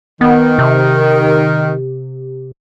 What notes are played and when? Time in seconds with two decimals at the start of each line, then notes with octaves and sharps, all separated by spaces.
0.21 D#3 B3
0.59 C3